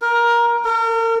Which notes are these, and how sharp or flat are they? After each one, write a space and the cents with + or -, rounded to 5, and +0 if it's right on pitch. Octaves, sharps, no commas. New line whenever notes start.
A#4 +15
A#4 -40